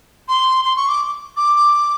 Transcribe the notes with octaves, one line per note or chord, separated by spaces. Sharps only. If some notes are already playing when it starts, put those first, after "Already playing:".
C6
C6
C#6
D6
D6